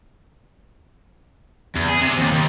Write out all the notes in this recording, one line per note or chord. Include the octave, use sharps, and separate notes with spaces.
E2
G#4
C3
D#2
D#2